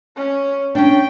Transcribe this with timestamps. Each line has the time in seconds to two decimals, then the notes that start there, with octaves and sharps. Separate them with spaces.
0.17 C#4
0.75 C#4 D4 G5